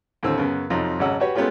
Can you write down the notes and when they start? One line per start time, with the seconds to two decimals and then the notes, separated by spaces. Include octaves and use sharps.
0.23 D#2 A2 D3 C4 E6
0.38 F#2 C#3 B3
0.70 F2 C3 F#3 D#4 F4
0.99 G#1 C#3 F#3 D#5 F#5 E6
1.20 F#4 G4 B4 C#5
1.36 G#3 A3 B3 C#4 F4 G4